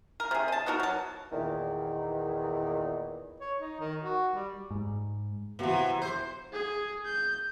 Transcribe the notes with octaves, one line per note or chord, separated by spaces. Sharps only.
A#4
C3 G#4
D#5 A5
B3 D#4 F#4 A#4
F#3 A5
E2 A#2 D#3 E3
C#5
D#4
D#3
F#4
G3
G#2
C3 E3 B3 F#4 F5
E4 C5
G#4
G6